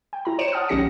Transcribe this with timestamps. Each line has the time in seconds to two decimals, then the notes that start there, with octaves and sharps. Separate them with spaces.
0.13 G5
0.25 E4 A#5
0.39 C5 C#5 C#7 D7 E7
0.52 F#5 A5 D#6 F6
0.68 A#1 D#3 C#4 G4 A#6 C#7